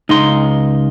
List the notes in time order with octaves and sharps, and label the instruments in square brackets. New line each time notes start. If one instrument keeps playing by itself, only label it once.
[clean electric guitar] C#2 C6 [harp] D#4